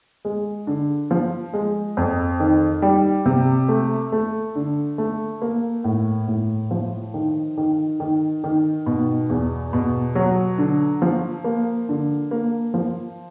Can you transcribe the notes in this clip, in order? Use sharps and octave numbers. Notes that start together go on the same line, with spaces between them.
G#3
D3
F3
G#3
F2
D#3
G3
C3
A3
A3
D3
A3
A#3
A2
A2
F3
D#3
D#3
D#3
D#3
B2
E2
B2
F#3
D3
F3
A#3
D3
A#3
F3